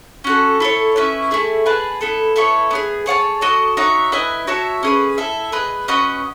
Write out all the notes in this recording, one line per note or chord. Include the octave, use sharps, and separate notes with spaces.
C#4 F#4 A4
E4 A4 C#5
C#4 E4 B4 E5
A3 E4 G#4
G#4 B4 F#5 A5
B3 E4 A4
B3 E4 A4 C#5
B3 E4 G#4
G#4 C#5 F#5 A5
F#4 A4 D#5
D#4 F#4 C#5 E5
E4 B4 D#5 G#5
F#4 C#5 E5 A5
C#4 G#4 B4
E4 A4 E5
G#4 B4 D#5
C#4 F#4 B4 D#5